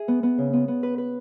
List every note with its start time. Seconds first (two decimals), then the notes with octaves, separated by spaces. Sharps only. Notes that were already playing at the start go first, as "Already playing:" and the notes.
Already playing: G#4 E5
0.08 B3
0.23 B3
0.38 C#3
0.53 B3
0.68 B3
0.83 B4
0.98 B4